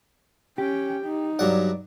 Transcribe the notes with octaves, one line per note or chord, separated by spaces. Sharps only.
C#4 G4 G5
D#4
G2 F#3 D5 F#5